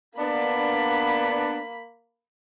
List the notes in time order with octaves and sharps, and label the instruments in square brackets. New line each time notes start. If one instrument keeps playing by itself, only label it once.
[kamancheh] A#3 B5 [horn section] B3 D4